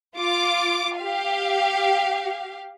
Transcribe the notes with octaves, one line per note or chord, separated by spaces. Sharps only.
F4 D6
G4 F5